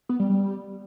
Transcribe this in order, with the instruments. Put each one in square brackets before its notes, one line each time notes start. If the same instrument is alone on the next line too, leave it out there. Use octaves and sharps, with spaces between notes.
[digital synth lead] B3
G3
G3